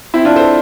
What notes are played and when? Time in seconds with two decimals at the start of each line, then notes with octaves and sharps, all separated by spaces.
0.14 C4 E4
0.25 D4 F4
0.36 A4 C5